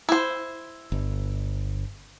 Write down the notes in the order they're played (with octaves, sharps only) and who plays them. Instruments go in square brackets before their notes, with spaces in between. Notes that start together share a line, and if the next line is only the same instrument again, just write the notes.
[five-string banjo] E4 C5
[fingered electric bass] G1